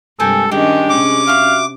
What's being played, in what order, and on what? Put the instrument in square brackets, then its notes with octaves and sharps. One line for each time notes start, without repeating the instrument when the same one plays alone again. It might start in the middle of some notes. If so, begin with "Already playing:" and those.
[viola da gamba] G2 C3 G#3 [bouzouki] G4 A#4 G#5 [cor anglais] A4
[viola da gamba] D#3 C#4 D4 [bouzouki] G#3 [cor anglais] G4
[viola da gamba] C3 C#4 [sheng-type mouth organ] D6
[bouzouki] F#4 E5 [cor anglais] F5